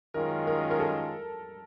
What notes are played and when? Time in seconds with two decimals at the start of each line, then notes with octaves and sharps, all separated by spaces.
0.14 F#2 D#3 G#3 C#4 F4 A#4
0.47 A#4
0.71 A#4
0.80 A4